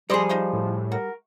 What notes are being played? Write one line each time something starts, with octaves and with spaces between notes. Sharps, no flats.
F3 G3 G#4 C5 D5 D#5
D#4 F4 C5
A2
F#4 A#4